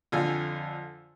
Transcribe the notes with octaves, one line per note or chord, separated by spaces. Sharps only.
F2 D3 F4 G#5